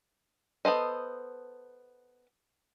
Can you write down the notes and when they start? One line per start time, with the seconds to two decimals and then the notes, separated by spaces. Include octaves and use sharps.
0.65 B3 A4 C5 D#5